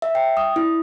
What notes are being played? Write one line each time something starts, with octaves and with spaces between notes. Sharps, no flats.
E5
G5
D#6
E4